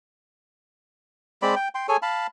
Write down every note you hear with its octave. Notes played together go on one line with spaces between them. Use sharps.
G#3 C4 D5 B5
G5
G5 C6
G#4 A4 C#5 G#5
F5 A5 B5